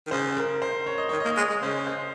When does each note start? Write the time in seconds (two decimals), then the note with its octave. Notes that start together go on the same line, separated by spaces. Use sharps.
0.07 D#3
0.11 C#3 C5
0.37 A#4
0.62 C5
0.86 C#5
0.98 D#5
1.09 D#3 C#5
1.20 A#3 D#5
1.31 C#5
1.37 G#3
1.49 G#3
1.62 C#3 C5
1.87 C5